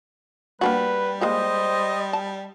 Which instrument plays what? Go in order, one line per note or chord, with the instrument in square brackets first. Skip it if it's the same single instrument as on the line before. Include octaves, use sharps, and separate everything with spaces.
[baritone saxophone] G3 [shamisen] A#3 D4 F#4 [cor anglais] B4
[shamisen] G#3 A#3 G4 [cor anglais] C5 [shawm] D#5
[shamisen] A5